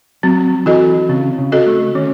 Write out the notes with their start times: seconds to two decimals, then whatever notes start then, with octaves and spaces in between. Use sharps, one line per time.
0.23 F#3 C4
0.66 E3 F#4 A4 D#5
1.09 C#3 C4
1.38 C#3
1.52 F#4 A4 D#5
1.66 A3
1.95 D#3 C#4